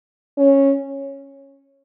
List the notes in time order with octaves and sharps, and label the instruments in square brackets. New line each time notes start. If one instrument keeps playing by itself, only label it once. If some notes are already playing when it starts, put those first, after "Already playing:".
[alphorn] C#4